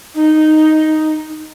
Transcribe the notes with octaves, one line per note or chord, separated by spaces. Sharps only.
D#4